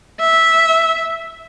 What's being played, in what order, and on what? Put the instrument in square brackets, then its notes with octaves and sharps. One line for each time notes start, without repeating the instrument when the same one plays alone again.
[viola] E5